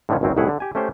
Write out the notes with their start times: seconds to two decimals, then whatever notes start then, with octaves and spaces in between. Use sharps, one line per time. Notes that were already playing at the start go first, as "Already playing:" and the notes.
0.09 A2 D3 D#3 F3 C#4
0.21 G#1 C#2 F#2 F#3 C4 C#4
0.36 C2 A2 D#3 E4 G#4 F#5
0.49 D3
0.60 G4 G#5
0.75 A3 C#4 G4 C5